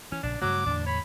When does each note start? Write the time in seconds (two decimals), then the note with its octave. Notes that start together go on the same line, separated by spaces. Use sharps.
0.12 E3 C#4
0.23 A#1 C#3 D4
0.42 G2 C#3 F#3 A3 D6
0.66 E2 A2 D3 D4
0.87 C#5 B5